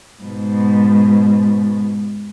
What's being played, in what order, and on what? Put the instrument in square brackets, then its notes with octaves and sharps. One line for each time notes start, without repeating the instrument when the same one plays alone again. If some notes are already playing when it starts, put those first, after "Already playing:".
[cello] G#2 B2